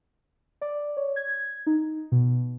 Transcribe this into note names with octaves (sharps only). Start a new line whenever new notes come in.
D5
C#5
G#6
D#4
B2